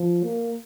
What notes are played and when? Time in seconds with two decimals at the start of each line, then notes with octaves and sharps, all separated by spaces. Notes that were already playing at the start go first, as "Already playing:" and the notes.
Already playing: F3
0.23 A#3